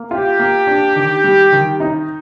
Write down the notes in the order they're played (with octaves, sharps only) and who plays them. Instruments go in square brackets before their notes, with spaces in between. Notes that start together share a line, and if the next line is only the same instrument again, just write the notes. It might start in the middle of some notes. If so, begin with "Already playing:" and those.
Already playing: [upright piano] A#3
[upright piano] F4 [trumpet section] G4
[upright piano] A#3
D4
D#3
G3
D#3
D#4